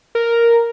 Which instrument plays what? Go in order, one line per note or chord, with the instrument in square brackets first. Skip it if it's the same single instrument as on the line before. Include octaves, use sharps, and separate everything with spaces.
[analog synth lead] A#4